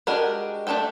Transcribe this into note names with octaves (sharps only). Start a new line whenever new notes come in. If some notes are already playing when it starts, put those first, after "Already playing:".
G#3 D4 F#4 G4 A#4
A3 D4 E4 A4 G5